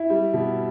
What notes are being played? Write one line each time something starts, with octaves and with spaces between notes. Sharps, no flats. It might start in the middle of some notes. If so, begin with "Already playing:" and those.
Already playing: E4
G3
B2